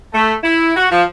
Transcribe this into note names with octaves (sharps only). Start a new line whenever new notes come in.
A3
E4
F#4
F3